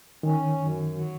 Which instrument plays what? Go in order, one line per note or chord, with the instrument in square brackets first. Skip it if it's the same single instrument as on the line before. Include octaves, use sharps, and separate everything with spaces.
[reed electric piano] D#3 [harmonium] C#4
[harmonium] F#2
F#3